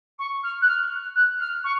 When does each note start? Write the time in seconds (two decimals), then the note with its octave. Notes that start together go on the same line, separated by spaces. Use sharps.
0.19 C#6
0.43 F6
0.62 F#6
0.67 F6
1.15 F#6
1.40 F6
1.64 C#6